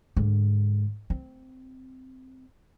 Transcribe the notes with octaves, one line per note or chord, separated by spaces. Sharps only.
G#2 D3
C4